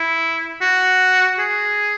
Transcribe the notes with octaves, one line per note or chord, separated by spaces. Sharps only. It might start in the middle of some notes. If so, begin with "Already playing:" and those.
Already playing: E4
F#4
G#4